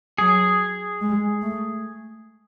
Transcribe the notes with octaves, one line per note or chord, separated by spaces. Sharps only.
F#3 G#4
G#3
A3